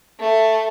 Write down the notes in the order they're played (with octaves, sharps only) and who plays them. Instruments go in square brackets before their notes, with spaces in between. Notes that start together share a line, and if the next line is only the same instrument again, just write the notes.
[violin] A3